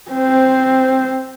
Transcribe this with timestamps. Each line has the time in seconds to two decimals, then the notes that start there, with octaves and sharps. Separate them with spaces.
0.11 C4 C5